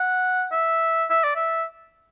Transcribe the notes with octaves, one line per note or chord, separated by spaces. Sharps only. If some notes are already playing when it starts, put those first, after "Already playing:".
Already playing: F#5
E5
E5
D5
E5